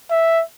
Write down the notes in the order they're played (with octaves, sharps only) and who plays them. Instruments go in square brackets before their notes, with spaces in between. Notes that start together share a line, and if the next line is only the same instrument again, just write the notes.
[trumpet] E5